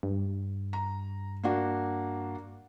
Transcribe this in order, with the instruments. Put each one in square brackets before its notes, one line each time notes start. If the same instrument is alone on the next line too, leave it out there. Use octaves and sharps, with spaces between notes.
[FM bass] G2
[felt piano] A#5
A#3 D4 F#4